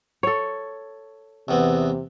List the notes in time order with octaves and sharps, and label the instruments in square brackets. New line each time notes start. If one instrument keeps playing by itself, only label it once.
[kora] A4 C#5
[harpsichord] E2 B3 C4 [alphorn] C3